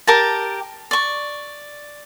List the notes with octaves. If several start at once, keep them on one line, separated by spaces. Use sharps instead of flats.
G4 A#4 A5
D5 C#6